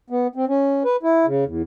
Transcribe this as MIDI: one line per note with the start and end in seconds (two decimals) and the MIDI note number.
0.10 0.27 59
0.36 0.45 60
0.48 0.83 61
0.85 0.96 71
1.03 1.26 64
1.26 1.44 49
1.45 1.62 40